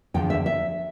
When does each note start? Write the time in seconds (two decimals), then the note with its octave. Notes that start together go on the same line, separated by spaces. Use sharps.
0.14 E2 D3 F3 G5
0.30 E5
0.46 E5